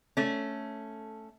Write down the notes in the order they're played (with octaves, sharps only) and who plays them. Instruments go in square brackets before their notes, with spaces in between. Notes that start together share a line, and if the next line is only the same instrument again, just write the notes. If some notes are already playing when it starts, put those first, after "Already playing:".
[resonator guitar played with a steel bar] A3 C#4